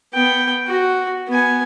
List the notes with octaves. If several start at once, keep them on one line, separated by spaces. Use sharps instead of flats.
B3 G5
F#4
B3 G#5